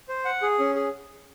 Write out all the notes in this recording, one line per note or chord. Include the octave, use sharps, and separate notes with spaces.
C5
F#5
G#4
C#4
G#4